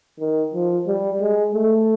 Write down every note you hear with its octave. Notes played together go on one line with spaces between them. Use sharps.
D#3
F3
G3
G#3
A3